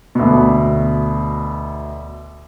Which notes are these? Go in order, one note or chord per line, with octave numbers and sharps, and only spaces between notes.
D2 B2